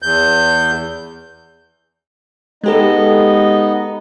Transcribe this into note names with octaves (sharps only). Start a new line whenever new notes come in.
E2 G6
G#3 B3 D#4 G4 A4 D#5